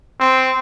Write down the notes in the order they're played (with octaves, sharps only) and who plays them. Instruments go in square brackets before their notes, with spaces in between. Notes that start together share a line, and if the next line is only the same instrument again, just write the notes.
[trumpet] C4